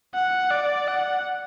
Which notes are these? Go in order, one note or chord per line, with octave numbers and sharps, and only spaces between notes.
F#5
D5
F#5